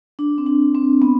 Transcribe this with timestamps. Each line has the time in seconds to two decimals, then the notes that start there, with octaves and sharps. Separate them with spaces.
0.19 D4
0.38 C4
0.46 D4
0.75 C4
1.02 B3